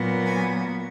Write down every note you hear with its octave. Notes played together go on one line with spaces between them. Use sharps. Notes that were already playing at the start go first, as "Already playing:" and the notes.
Already playing: A#2 F#3 B3
G#5